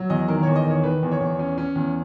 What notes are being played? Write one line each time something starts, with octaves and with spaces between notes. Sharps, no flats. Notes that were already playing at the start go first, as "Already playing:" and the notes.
Already playing: F#3
E2 D#5
D#3 A#4
E2 C#5
D#5
D#3 C#5
D#3 B4
E2
C#5
E2
C#4
C#4
E2